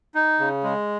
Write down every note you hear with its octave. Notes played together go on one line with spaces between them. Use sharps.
D#4
C#3
G#3